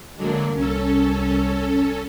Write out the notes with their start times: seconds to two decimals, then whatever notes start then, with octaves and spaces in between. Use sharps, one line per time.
0.17 D3 F#3 G#3 A#3 D4
0.54 C2 C#4 A4